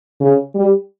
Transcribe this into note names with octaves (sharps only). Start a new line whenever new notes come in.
C#3
G3